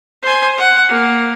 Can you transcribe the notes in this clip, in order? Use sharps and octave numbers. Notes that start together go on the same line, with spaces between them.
C5 G#5
F#5
A#3